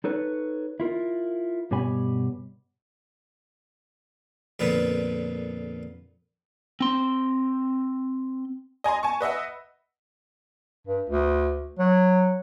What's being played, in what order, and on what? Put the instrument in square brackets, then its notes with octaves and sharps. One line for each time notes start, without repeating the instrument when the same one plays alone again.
[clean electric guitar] D#4 A4 B4 C#5
E4 F4 A#4
G2 B2 G4 C#5 G#5 B5
[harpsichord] F2 A#2 D3 B3
[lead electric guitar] C4 C6
[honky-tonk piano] D#5 G#5 A#5 C6
G#5 A5 C#6
B4 D#5 E5 F#5
[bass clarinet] G2
D2
F#3